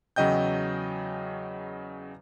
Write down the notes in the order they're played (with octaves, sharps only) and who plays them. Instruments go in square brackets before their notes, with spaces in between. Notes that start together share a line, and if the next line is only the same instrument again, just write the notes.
[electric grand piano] E2 C#3 F#3 D#5 G5 G6